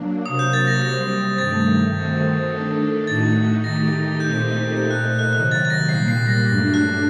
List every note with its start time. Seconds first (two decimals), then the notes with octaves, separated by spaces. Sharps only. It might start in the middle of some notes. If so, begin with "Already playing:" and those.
Already playing: F#3 A#3 D4
0.25 C3 F#3 A#3 F#4 D#6
0.39 G6
0.53 A6
0.67 A#6
0.82 C3 G3 C4 A#6
1.38 G2 D#3 A3 A6
1.94 D#3 A3 C4 F#4
2.52 D#3 A3 D4 A4
3.07 A2 A3 D#4 F#4 A6
3.63 D#3 A3 D#4 G4 A#6
4.20 A#2 A3 C4 D#4 G4 G6
4.77 A#2 A3 D#4 G6
4.91 F#6
5.19 F#6
5.33 C3 D#3 F#3 F#6
5.51 A6
5.65 A6
5.70 A#6
5.89 A#2 G3 A#3 C7
6.08 C7
6.27 A#6
6.46 G2 F#3 A3 D4 A#6
6.74 F#6